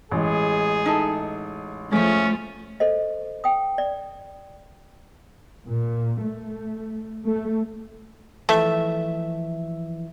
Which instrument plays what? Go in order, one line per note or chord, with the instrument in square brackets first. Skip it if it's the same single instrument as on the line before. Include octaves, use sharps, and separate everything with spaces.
[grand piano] A1 G#3 [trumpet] G#4
[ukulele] D#4 E4 A4
[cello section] F3 A3 [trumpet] C#4 [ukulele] G#4 E5
[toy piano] A4 C5 D#5
G5 D#6
D5
[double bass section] A#2
A3
A3
[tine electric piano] E3 F3 [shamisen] A3 [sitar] E5